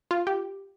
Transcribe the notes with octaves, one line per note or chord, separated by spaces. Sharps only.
F4
G4